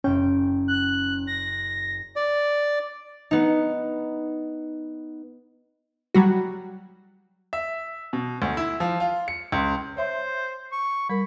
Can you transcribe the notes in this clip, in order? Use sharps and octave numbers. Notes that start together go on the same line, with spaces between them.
F#1 C#4 G5
F#6
A#6
D5
B3 D#4
F#3 G3 F#4
E5
B2
D2
E4
F3
F4
C#7
C#2
C5 C#5 E5 C6
C#6
G3 A#4 B5